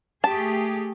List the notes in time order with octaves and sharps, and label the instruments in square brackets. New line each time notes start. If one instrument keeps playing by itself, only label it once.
[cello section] A3 G4 G#4 [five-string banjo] A5